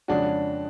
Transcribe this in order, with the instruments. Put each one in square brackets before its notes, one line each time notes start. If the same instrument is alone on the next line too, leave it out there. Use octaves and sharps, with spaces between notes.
[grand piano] F2 C#3 G#3 C#4 [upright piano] D4 F#4